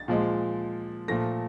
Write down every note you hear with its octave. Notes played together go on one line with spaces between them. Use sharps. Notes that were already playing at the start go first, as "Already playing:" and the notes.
Already playing: A6
A#2 F3 G#3
A#2 F3 A3 A#6